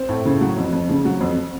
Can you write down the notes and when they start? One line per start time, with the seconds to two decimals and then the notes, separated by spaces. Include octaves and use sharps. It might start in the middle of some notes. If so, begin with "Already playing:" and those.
Already playing: C4
0.09 A2
0.25 C#3
0.41 F#3
0.57 F2
0.73 F2
0.90 C#3
1.05 F#3
1.21 F2